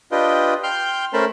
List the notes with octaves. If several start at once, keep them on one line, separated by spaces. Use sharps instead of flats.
D4 F4 G4 B4 D#5 G5
G5 C6 F6 G6
A3 C#4 A#4 C5 A5 B5